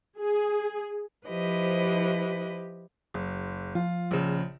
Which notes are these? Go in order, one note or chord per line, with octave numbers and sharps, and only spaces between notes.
G#4
F3 E4 G4 B4 C5 D#5
F#1
F3 F4
A#1 C#3